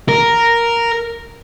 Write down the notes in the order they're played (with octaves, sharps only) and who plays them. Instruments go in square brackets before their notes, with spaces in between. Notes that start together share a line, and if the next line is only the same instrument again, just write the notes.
[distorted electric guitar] A#4